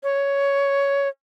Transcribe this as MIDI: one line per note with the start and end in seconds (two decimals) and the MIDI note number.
0.03 1.08 73